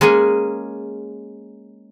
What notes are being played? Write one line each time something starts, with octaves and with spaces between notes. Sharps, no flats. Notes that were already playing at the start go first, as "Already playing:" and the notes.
G#3 A#3 C#4 G#4 G#5